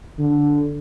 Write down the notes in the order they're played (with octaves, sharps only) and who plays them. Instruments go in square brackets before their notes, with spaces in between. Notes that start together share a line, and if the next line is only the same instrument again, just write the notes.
[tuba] D3